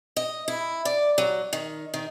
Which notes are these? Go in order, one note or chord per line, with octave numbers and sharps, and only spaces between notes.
D#5
E4
D5
F#3
D#3
D#3